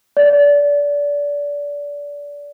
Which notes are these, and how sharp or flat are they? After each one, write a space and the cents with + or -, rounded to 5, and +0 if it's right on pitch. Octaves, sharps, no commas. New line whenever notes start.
D5 -25